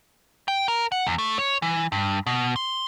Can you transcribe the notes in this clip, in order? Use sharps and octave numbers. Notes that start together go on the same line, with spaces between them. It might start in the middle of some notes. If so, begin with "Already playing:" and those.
G5
A#4
F#5
E2
A3
C#5
E3
G2
B2
C6